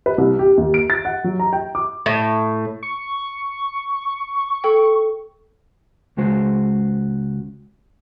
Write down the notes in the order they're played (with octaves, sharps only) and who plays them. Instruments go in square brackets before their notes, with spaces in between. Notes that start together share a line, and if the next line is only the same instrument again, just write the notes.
[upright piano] B4
C2
G4
D#2
D7
A6
F#5
F#3
A#5
G5
D6
[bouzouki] A2
[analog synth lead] C#6
[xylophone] A4 G5
[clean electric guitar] C#2 C#3 G#3 F#4 C5